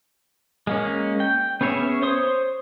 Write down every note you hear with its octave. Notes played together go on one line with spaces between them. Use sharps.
G#3 A#3 C#4
G5
B3 C#4 G#4 C#5 E5
C5 C#5 C6 D#6